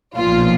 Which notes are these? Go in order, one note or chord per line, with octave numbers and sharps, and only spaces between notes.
B1 A#2 F3 F4